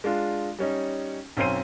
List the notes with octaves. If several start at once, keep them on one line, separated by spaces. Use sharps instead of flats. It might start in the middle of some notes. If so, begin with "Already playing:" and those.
G#3 D4 F4
G3 C#4 D#4
B1 F#2 C4 C#4 C5 D#7